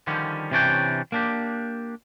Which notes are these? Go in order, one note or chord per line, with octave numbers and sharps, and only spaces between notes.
D3 D#3 F3 G3 C#4
C3 E3 C#4 D4 C#5 G5
A#3 D4 G4